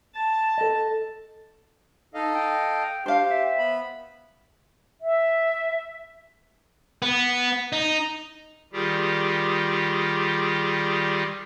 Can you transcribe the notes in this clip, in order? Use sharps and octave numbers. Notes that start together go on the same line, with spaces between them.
A5
A4 D#5
D#4 A4 D#5 F5
G5
D4 G4 C5 F5
E5
B3 B5
E5
B3
D#4
D#3 G3 F4 G4 G#4